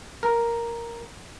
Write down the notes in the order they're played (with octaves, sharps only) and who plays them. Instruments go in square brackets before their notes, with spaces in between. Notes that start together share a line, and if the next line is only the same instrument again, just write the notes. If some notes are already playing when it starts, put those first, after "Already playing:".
[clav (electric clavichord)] A#4